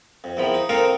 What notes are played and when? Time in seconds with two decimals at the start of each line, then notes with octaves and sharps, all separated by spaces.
0.24 F2
0.37 E2 D#3 F3 B5
0.54 D#4
0.69 A#3 C4 D#4 A4 A#4 F5
0.84 D#3